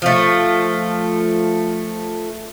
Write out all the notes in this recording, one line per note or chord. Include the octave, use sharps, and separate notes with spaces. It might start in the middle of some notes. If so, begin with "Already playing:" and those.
F3 A3